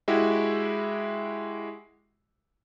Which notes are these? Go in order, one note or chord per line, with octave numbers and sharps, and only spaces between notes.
G#3 E4 F#4 G4